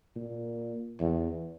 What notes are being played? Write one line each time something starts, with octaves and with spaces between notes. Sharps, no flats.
A#2
E2